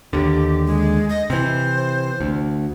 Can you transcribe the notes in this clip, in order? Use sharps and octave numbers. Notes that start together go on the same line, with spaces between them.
D#2 D3 G4
G#3
D#5
C3 E3 C5
D2